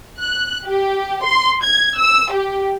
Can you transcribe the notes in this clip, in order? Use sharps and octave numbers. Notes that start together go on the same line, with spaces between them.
F#6
G4
C6
G#6
E6
G4